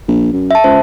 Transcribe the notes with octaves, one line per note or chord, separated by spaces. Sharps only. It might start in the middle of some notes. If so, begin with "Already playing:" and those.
A#1
F#2
E5 A5
C#2 C5